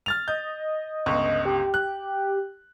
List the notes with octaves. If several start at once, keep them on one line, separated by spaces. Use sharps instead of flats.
F6 A6 F7
D#5 G6
G1 C#2 C#6
G4
F#6